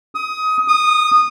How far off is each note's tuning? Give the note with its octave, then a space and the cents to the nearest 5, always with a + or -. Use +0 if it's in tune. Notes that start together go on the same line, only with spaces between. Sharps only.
D#6 +20
D#6 -20